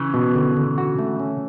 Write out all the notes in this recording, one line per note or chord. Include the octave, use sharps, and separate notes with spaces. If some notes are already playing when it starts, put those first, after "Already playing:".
Already playing: C#3 E3
B2
D3
D3
F#4
A3
C#4